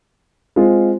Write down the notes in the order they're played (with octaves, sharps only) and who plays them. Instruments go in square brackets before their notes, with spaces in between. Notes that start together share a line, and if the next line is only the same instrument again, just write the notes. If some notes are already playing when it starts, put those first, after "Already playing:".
[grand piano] G#3 C4 F4 G#4